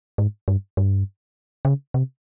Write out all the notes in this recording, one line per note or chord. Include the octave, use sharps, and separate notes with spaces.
G#2
G2
G2
C#3
C3